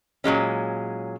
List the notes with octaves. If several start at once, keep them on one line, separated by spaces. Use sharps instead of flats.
A#2 F#3 G#3 C#4